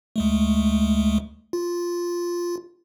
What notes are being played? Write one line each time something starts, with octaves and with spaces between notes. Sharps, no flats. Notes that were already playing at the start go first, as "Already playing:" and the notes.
D2 G#3 A3
F4